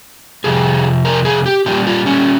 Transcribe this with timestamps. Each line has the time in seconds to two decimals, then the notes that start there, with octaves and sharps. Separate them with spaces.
0.44 F2 C3 G#4
1.05 A#4
1.25 G#4
1.46 G4
1.66 A#2 G3 G4
1.87 F4
2.06 C#4